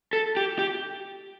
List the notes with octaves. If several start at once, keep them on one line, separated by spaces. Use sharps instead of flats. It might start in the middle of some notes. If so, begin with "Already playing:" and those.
A4
G4
G4